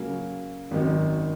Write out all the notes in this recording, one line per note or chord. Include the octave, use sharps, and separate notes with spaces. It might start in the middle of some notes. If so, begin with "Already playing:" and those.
Already playing: C#3 F#3 A#3 C#4
G#1 F#2 D#3 F#3